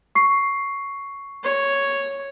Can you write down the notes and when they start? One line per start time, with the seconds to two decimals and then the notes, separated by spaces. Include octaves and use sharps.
0.15 C#6 C7
1.44 C#5